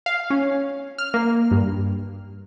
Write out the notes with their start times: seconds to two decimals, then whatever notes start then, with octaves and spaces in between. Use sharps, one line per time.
0.06 F5
0.30 C#4
0.98 F6
1.14 A#3
1.51 G2